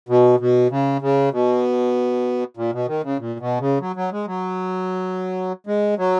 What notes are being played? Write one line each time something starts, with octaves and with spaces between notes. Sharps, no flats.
B2
B2
C#3
C#3
B2
A#2
B2
D#3
C#3
A#2
B2
C#3
F#3
F#3
G#3
F#3
G#3
F#3